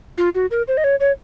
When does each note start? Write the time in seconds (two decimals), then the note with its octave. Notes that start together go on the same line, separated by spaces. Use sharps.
0.18 F4
0.35 F#4
0.51 A#4
0.68 C5
0.77 D#5
0.84 C#5
1.00 C#5